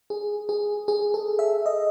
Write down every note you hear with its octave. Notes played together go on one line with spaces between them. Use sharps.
G#4
G#4
G#4
A4
E5
D#5